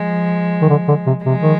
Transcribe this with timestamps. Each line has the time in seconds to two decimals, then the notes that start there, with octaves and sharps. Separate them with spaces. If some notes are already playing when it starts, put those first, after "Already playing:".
Already playing: F3 G#3
0.62 D#3
0.69 D3
0.88 D3
1.07 C3
1.25 C3 F3 G#3
1.42 D#3